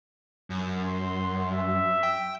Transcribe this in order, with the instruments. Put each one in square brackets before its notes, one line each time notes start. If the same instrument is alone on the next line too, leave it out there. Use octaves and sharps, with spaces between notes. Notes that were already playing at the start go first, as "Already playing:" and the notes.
[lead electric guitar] F#2
[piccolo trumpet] C6
E5
[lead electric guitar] G5